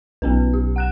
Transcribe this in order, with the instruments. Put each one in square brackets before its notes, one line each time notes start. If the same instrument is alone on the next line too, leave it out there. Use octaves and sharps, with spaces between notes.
[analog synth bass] B1 [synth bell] B3 C#4 B4
[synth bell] G4
F#5 F#6 E7